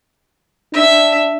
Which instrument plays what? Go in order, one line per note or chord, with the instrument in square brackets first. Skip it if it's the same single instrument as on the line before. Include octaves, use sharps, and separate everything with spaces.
[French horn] D4 [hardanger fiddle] E5